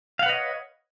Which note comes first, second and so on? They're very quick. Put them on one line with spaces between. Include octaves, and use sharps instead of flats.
F5 F#5 B4 D#5 C#5